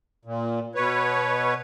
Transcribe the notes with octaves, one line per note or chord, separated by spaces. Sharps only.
A#2
B2 B4 C#5